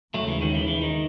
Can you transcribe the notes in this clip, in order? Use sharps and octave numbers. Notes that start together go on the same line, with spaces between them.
D#2 C#3 F#3 G#3 A3
E3
D#3 F#3
E3
E3
D#3